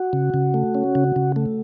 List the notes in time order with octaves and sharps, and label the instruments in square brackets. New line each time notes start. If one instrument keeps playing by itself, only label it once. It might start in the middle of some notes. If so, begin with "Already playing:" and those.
Already playing: [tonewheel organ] F#4
C#3
C#3
A3
C#4
C#3
C#3
A3